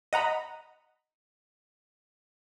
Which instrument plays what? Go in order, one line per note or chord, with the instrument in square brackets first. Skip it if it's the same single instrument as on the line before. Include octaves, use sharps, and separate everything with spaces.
[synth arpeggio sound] D#5 F#5 A#5 B5